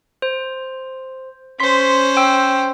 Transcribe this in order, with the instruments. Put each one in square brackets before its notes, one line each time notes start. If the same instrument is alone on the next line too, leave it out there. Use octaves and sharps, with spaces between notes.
[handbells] C5
[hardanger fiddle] C#4 C5 [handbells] C6 B6
[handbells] G5 E6